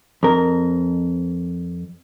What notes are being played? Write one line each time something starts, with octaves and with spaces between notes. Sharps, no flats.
F2 A#4